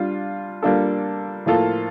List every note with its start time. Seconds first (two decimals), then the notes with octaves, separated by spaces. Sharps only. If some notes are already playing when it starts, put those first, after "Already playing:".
Already playing: G3 D4 F4
0.62 G3 A#3 D4 F4 A4
1.46 A2 F3 A#3 F4 A4